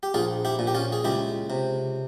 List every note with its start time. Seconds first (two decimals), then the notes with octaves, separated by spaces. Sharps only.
0.03 G4
0.14 A#1 F4 G#4
0.45 E4 G4
0.59 A#2
0.67 G4
0.75 C#4 F4
0.92 G#4
1.04 C#2 E4 G4
1.50 C3